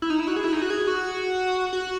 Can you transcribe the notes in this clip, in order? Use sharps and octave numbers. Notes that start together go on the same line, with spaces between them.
E4
D#4
E4
F#4
G#4
E4
D#4
F#4
G#4
F#4
F#4